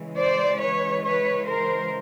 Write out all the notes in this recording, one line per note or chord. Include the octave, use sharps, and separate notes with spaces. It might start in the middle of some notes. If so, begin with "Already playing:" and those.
Already playing: C#3 E3 G#3
C5 D5
B4 C#5
B4 C#5
A#4 C5